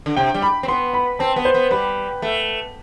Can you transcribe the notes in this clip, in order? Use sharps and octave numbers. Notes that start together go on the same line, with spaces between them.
D3
C3 G5
G3
B5
C4
B3 C6
B5
C4 A5
B3
C5
B3
G3 B4
A3